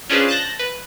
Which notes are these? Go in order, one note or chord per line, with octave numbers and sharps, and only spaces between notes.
C#4 D4 F4 G#4 B4 C5
A5 F#6 G6 A#6
B4